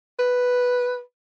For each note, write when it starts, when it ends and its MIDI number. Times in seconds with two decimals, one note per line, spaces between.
0.19 1.00 71